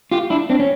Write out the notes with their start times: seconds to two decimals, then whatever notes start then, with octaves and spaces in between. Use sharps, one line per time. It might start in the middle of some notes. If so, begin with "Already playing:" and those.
0.12 F4 G4
0.30 D4 E4
0.50 C4 D4
0.59 C#4